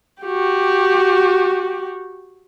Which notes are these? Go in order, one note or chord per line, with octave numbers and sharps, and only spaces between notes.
F#4 G4